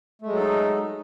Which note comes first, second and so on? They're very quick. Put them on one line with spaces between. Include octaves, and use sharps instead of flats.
A3 G#3 F#3 A4 D#4